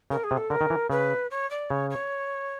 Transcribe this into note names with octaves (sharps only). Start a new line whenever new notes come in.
C#3 A#4
G#4
C3
A4
D3 A#4
D#3
E3
C#3 B4
C#5
D5
C#3 C#5
C#5